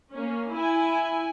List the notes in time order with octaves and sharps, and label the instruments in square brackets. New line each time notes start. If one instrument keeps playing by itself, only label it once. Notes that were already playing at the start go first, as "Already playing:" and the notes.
[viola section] A#3 C#4
E4 G#5